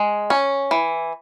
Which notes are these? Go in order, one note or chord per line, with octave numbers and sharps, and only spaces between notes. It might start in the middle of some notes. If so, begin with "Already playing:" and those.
Already playing: G#3
C#4
E3